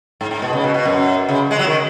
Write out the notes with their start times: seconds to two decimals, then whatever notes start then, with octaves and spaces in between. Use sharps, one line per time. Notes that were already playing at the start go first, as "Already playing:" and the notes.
0.21 G#2
0.31 G#2
0.42 B2
0.53 C#3
0.64 B2
0.74 B2
0.85 F#2
1.29 C#3
1.51 G#3
1.59 F#3
1.67 D#3